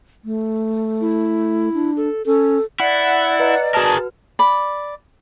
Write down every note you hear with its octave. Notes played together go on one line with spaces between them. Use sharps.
A3
E4
D4
A4
C#4 A4
E4 D5 F#5
B4 D#5 A#5
F#4 G#4 A#4 B4 A5 F6
D5 B5